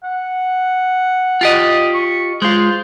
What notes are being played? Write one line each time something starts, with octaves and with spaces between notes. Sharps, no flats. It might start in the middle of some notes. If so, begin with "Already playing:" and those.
F#5
F4 G4 D#5
C#6
G#3 F4 C5